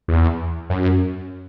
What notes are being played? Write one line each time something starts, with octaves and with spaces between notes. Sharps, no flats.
E2
F#2